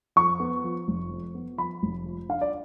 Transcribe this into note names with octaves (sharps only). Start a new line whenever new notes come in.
F2 C#6
B3
F3
F1
F2
B3
F3 B5
F1
F3
D4 F5
D5